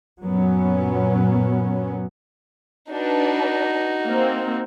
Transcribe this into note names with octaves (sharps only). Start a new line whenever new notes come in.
F#2 A#2 F#3 B3 C#4
D4 D#4 F#4 B4
A#3 C4